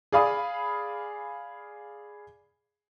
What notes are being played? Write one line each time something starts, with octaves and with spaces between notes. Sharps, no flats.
G#4 D5 F5 B5 D#6